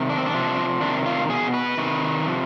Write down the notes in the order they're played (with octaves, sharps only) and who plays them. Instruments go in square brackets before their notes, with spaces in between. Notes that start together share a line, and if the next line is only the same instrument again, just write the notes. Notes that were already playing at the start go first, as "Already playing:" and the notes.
Already playing: [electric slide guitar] C3 D#3
D4
C4
D4
C3 F3
C3 D#3 D4
F4
B2 G#4
B4
C3 D#3
C3 F3